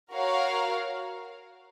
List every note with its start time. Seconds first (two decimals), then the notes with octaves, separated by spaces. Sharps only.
0.13 F#4 A#4 C#5 F5